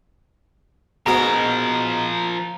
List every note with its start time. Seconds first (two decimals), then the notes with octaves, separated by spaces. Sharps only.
1.06 G#2 B2 F3 A#4 A#5 B5